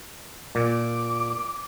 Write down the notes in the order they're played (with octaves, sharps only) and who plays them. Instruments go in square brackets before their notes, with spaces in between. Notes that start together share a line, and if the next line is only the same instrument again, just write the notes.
[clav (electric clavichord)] A#2 [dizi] D6